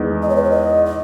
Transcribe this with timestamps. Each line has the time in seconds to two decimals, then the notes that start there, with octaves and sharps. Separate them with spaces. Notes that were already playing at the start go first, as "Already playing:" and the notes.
Already playing: E2 D#3 G#3
0.22 D#5
0.29 C#5
0.36 B4
0.44 C#5
0.51 D#5
0.86 D#5